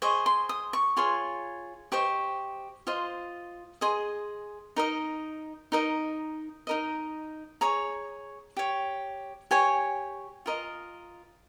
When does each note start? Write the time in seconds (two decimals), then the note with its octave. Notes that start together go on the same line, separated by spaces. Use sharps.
0.02 G#4 C5 D#5 C#6
0.26 C6
0.49 D#6
0.73 C#6
0.97 F4 G#4 C#5 C6
1.92 G4 C5 D#5 C#6
2.87 F4 C5 D#5
3.81 G#4 D#5 C6
4.76 D#4 A#4 D#5
5.72 D#4 A#4 D#5
6.67 D#4 A#4 D#5
7.61 G#4 C#5 A#5
8.57 G4 C#5
9.51 G4 C#5 G#5
10.46 F4 A#4 D#5